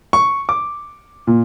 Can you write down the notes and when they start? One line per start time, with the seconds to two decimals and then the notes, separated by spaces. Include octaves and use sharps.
0.13 C#6
0.49 D6
1.27 A#2